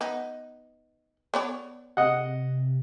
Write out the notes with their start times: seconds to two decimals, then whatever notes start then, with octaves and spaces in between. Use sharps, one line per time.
0.01 B3 D#4
1.34 B3 C#5 D5
1.97 C3 D#5 F#5